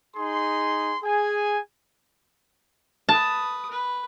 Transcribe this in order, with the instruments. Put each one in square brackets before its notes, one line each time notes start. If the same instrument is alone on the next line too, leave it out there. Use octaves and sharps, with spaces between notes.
[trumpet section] D#4 G#4 C6
G#4 G#5
[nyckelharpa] B4 D#6 [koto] A5
[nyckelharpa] B4